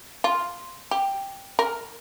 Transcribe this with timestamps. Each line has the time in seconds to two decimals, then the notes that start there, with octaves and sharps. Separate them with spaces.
0.24 F4
0.91 G4
1.59 A#4